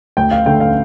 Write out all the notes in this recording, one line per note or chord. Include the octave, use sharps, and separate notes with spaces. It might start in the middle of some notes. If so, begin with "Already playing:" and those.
D2 G5
F5
D3 A3 G5
F5